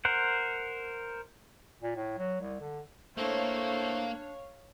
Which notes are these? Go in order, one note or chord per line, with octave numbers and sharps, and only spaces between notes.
A#4 C5 F#5
A#2
A2
F#3
C2
D3
A2 A3 A#3 D4 C5 C#5 F5